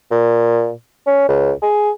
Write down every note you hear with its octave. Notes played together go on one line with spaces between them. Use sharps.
A#2
C#4
C#2
G#4